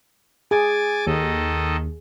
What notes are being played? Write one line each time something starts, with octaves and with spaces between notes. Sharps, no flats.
G#4 G#5 D6 A6
D#2 D#3 A4 D#5